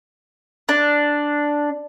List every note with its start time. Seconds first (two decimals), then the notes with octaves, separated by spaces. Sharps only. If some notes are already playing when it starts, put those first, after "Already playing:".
0.69 D4